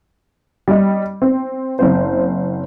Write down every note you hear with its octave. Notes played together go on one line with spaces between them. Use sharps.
G3 D#5
C4
F#1 C4 C5